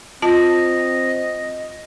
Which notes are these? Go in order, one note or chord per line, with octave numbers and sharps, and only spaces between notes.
C4 F4 D#5 A5